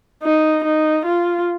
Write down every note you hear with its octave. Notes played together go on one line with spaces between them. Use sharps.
D#4
D#4
F4